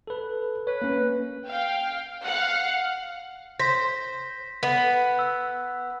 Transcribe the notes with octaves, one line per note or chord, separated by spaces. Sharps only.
A4 B4
B4 C#5
A#3 C#4
F5 G5
F5 F#5
C5 A#6 B6
B3
E6